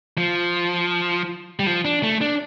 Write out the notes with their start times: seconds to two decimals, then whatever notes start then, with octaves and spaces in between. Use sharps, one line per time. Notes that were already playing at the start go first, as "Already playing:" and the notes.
0.18 F3
1.59 G3
1.67 F3
1.85 D4
2.03 A3
2.21 D4